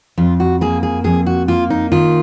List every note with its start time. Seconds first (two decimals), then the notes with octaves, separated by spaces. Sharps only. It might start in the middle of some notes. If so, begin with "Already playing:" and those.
0.18 F2 F4
0.40 F#4
0.61 A#3 G#4
0.83 G#4
1.04 F2 G#4
1.26 F#4
1.48 A#3 F4
1.70 D#4
1.92 D#3 F4